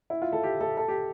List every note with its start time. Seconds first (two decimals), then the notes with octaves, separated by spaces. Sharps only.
0.10 E4
0.22 F4
0.32 A4
0.43 G4
0.61 A4
0.77 A4
0.88 G4